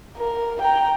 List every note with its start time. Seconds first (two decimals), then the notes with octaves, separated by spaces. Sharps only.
0.18 A#4
0.62 G5 A#5